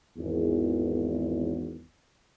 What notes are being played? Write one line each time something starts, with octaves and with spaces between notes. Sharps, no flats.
G#1 E2